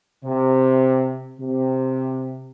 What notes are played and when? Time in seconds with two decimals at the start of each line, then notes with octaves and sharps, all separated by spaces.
0.25 C3
1.40 C3